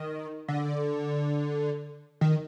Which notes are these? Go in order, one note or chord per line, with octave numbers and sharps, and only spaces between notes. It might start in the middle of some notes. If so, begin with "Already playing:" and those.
Already playing: D#3
D3
D#3